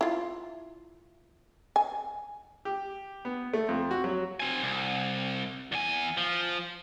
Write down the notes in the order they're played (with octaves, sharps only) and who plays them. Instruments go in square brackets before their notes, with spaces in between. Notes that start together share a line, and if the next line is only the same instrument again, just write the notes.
[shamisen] E4 F4
G#5
[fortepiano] G4
B3
A3
F2
F#4
F#3
[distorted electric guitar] C4 G#5
C2
E2 G#5
F3